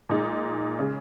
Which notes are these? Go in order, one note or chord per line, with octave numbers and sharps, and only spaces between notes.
A#2 G#3 D#4
C#3 G#3